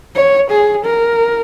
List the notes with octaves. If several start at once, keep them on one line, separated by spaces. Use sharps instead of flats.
C#5
G#4
A#4